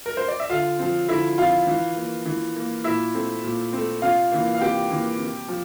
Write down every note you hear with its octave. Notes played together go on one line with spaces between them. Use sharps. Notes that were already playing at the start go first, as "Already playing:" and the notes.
A#4
C5
D5
E5
D3 F4 F5
F3 C4
D3 E4 E5
F3 C4 F4 F5
E3
A#3
E3
A#3
A#2 E4 E5
A3 C4
A#2
A3 C4
C3 F4 F5
E3 A#3
F5
C3 G4 G5
E3 A#3
C3
F3